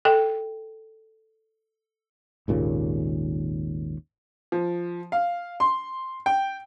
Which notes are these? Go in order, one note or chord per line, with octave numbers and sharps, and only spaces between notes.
A4 G5
G#1 D#2 A#2 C#3
F3
F5
C6
G5